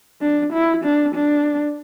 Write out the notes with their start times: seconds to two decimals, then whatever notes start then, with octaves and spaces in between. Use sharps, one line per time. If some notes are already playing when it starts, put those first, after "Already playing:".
0.21 D4
0.53 E4
0.84 D4
1.15 D4